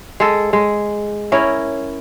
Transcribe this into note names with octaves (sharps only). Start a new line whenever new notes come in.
G#3 A4
G#3
C#4 E4 A#4